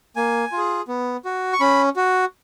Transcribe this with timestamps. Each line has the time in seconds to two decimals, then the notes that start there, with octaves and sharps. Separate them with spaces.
0.16 A#3 G#5
0.52 F4
0.58 G#4
0.88 B3
1.25 F#4
1.53 C#6
1.60 C#4 B5
1.96 F#4